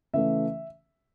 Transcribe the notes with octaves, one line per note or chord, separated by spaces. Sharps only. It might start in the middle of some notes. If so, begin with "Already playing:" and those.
C#3 E3 A3 E5